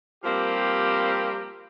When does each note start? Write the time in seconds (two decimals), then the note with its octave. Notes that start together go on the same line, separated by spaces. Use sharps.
0.24 F3 G3 A#3 C4 G4